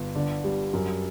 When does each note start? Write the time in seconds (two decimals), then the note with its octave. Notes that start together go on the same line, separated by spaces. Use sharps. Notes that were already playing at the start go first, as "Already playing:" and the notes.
Already playing: G1
0.15 D3
0.44 G3
0.73 F#2